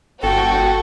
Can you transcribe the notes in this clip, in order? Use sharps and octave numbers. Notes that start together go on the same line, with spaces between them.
G1 F#4 A4 F#5 G5 C#6